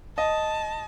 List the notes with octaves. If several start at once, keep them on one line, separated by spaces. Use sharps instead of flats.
D#5 A5